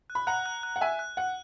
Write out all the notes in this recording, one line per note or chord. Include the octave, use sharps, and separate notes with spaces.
F#6
B5
F#5 A#5 F#6
F#6
F#6
F#5
E5 G#5 F#6
F#6
F#5 F#6